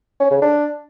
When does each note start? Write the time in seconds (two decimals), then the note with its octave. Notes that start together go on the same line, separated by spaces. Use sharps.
0.20 C#4
0.31 C#3
0.42 D4